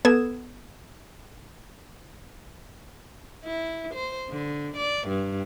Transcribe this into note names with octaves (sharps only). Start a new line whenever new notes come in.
B3 A4 B4 D#6 G#6 E7
E4
C5
D3
D5
G2